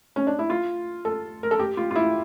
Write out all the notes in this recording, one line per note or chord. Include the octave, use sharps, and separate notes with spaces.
C#4
D4
E4
F4
A4
A#4
A4
G4
F4
F4
E4